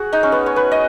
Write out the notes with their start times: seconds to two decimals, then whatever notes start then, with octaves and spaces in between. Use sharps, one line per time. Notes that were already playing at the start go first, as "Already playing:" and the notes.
Already playing: F#4 G#4
0.13 D#4
0.23 C#4
0.32 B3
0.46 C#5
0.56 B4
0.72 D#5